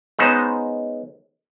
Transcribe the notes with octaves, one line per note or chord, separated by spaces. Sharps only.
G#3 B3 C#4 D#4 C5